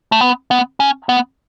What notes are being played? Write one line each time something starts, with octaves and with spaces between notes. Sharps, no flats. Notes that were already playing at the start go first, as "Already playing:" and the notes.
A3
B3
B3
C#4
B3